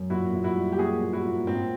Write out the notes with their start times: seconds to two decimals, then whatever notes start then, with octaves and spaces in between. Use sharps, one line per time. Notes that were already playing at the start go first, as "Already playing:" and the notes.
Already playing: F#2
0.10 A#2 E4 F#4
0.33 A#2
0.44 E4 F#4
0.55 G3
0.72 G4
0.78 A#3 F#4 G#4
1.01 A#2
1.13 E4 F#4
1.24 A#2
1.47 G#2 C4